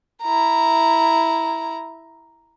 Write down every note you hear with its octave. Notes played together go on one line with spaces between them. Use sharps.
E4 A#5